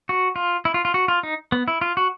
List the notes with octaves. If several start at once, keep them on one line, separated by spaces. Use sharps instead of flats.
F#4
F4
E4
F4
F4
F#4
F4
D#4
B3
E4
F4
F#4